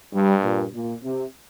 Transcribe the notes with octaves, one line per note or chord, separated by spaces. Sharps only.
G2 G3
A#2
A#2
C3